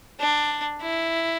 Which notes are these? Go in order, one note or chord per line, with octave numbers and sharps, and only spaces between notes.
D4
E4